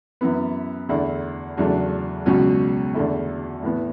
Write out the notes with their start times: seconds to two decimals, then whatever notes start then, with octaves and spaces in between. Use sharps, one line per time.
0.21 F#2 E3 B3
0.89 E2 D3 A3 E4
1.57 E2 C#3 F#3 A3 D4
2.26 C#2 B2 F#3 C#4 F#4
2.94 E2 D3 A3 E4
3.62 A2 E3 B3